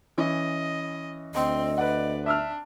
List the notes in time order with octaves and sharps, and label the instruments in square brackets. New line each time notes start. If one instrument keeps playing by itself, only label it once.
[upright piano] E3 C#4 [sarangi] D#5
[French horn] D2 [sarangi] C4 [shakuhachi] D#5
[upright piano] B4 F#5 [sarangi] D5
[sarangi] D4 [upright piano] E5 E6 F6